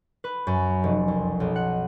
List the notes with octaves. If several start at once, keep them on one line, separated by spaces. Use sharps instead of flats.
B4
F#2
F1
C2
B1
F#5